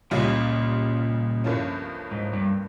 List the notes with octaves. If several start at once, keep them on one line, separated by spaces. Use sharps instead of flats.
C#2 A#2 C#3 G3 C#4 F4
G1 G2 F3 A#3 C#4
G#2
G2